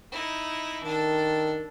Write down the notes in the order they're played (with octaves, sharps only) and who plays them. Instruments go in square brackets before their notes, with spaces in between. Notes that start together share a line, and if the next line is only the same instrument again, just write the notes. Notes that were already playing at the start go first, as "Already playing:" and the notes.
[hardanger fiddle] D#4 E4
[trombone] D#3 [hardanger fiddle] D4 A4